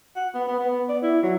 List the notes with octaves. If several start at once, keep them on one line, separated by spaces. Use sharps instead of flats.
F#5
B3
B3
B3
D5
E4
F#3